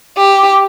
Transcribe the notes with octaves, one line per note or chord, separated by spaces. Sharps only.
G4